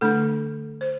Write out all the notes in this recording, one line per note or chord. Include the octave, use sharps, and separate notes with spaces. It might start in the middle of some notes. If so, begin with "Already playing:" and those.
D3 A3 D4 A4
C5